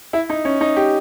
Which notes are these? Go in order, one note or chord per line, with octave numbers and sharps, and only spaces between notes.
E4
D#4
C#4
D#4
G4